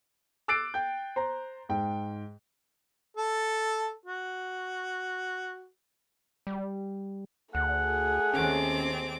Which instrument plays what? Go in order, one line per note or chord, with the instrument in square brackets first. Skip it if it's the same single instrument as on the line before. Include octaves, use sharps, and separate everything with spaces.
[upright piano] D6 E6 F#6 A6 C7 D7
G5 G6
C5 A#5
G#2 G5
[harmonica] A4
F#4
[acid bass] G3
[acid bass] D2 [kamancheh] A3 G#4 [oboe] F#5
[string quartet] D#2 C4 D6 [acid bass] C#4